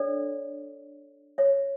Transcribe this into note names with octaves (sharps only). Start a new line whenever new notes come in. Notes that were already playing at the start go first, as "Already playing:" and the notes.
Already playing: D4 A4 C#5 D5
C#5 E5